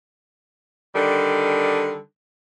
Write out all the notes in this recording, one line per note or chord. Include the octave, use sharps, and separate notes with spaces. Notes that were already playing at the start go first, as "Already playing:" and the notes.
D3 D#3 G3